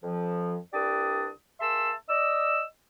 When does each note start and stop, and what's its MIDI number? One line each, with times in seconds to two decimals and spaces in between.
0.03 0.57 41
0.03 0.57 53
0.74 1.29 36
0.74 1.29 62
0.74 1.29 67
0.74 1.29 71
0.74 1.29 74
0.74 1.29 87
1.60 1.92 58
1.60 1.92 68
1.60 1.92 76
1.60 1.92 81
1.60 1.92 84
1.60 1.92 88
2.09 2.62 74
2.09 2.62 75
2.09 2.62 88